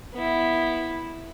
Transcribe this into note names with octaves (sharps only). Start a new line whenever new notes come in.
B3 E4